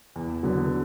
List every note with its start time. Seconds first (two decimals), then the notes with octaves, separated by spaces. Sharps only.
0.16 E2
0.43 D3 F#3 B3